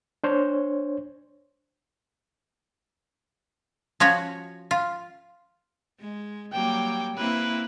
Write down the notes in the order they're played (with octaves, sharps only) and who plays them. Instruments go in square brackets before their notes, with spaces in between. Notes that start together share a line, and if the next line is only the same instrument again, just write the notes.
[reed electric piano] D4 C5 C#5
[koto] F3 C#4 F#4 C#5
F4
[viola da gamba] G#3
[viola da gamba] F#3 G3 A#3 [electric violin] G5 D6
[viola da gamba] A#3 C4 E4 [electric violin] B4